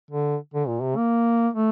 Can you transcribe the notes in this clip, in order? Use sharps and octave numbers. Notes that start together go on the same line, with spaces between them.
D3
D3
A#2
C3
A#3
A3